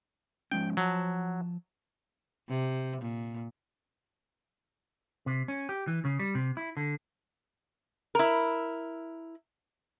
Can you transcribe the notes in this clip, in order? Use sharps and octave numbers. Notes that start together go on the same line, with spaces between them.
F3 G#3 C#4 G5
F3 F#3 A5
C3
A#2
C3
C#4
G4
E3
C#3
G3
C3
E4
D3
E4 A#4